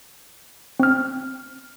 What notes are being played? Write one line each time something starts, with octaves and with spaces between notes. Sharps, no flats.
C4 F6